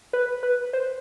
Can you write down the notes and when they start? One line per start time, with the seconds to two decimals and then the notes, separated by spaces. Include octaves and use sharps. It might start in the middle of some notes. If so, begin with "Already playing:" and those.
0.13 B4
0.43 B4
0.73 C5